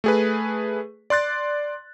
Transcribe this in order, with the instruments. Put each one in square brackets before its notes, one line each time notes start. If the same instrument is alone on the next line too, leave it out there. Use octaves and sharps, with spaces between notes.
[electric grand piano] A3 G#4 B4
D5 C6 F#6 A6